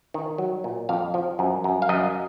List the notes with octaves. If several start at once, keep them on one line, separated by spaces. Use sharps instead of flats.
D#3
F#3
A#2
F2 F5
F3
F#2
F#2
F5
F#2 D#5